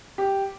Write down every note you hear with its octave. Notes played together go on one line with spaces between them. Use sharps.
G4